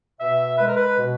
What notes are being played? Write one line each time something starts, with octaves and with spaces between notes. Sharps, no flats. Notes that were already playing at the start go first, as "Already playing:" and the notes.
B2 E5
G#3 B4
A#4
B4
B2